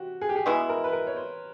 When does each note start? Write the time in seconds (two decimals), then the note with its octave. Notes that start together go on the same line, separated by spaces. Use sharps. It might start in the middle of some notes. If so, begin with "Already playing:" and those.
Already playing: C3 F#4 G4
0.21 G#4
0.29 G4
0.36 G#4
0.46 B2 G#3 B3 E4
0.69 A#4
0.84 B4
0.93 A#4
1.07 C#5
1.17 C5